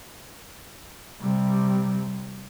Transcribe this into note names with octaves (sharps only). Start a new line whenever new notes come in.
C3 G3